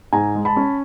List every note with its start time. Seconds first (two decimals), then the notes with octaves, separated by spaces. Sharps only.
0.13 G#2 G#5 A#5
0.35 G#3
0.45 A5 B5
0.56 C#4